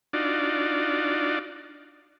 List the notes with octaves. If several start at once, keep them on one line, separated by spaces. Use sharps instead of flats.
D4 D#4 F4 F#4 D5